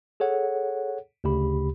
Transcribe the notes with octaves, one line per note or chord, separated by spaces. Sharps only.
G#4 A4 C#5 F#5
D2 C#3 G4 B5